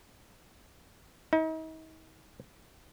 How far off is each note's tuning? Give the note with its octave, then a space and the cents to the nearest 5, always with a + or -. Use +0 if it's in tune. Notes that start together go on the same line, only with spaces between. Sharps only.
D#4 +40